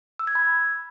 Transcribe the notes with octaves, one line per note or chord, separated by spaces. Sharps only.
E6
G#6
B5